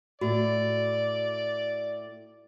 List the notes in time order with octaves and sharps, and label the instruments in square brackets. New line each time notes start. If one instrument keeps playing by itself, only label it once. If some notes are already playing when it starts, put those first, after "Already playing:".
[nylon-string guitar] A2 [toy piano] F#4 [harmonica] D5